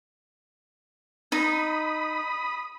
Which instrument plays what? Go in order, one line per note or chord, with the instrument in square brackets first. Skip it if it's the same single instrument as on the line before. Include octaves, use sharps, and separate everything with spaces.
[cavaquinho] D#4 [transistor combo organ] B5 D#6